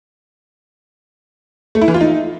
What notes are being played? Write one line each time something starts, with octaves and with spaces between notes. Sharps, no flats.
A3
E4
E3
F4
D#4